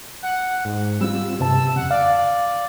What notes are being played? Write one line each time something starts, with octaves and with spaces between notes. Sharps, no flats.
F#5
G#2
G3 C4 F4 E6
G2 C3 A5
F2 C#3 F#5
D5 F5